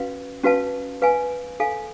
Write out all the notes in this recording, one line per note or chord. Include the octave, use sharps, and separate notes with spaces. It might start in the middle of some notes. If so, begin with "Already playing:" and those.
Already playing: C#4 F#4 B4 F5
C#4 F#4 B4 F5 A5
B4 F5 G#5
A4 F5 G#5